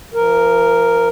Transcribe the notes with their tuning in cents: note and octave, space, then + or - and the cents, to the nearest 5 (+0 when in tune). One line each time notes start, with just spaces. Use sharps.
F3 -40 A#4 +0